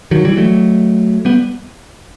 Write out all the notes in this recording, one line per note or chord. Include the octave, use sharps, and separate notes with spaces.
D#3 F#3
E3 G3
F#3 A3
G3 B3